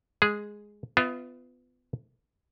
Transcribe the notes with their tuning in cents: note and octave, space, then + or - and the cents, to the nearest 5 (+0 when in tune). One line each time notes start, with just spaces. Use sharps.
G#3 +0 G#4 +0
B3 +25 F4 -10 E5 -35